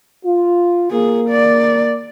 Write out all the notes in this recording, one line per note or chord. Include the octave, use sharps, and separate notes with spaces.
F4
A#3 G#4
D5